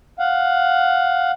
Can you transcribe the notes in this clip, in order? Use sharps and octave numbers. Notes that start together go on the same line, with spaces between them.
F5 F#5